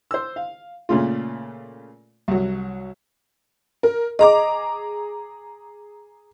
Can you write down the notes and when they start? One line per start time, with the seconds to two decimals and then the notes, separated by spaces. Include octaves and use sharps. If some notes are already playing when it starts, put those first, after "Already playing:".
0.11 C5 E6
0.36 F5
0.89 A#2 C#3 A3 F4
2.28 C2 F#3
3.83 A#4
4.19 G#4 D#5 A#5 D6